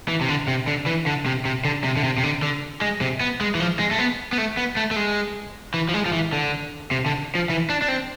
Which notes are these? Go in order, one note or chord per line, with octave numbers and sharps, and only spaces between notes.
E3
C3
D3
C3
D3
E3
D3
C3
C3
D3
C3
D3
C3
C3
D3
D3
G#3
C3
B3
G#3
E3
F3
G#3
A3
B3
B3
A3
B3
A3
A3
G#3
E3
F3
G#3
F3
E3
D3
C3
D3
F3
E3
D4
D4
C4